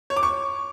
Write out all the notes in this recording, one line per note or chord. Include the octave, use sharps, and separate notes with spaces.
C#5
D6
C#6